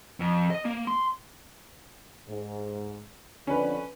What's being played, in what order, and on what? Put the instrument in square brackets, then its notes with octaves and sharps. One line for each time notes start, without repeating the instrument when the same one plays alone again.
[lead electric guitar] F2
D#5
A#3
C6
[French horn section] G#2
[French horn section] F2 D3 D4 [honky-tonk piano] C#4 B4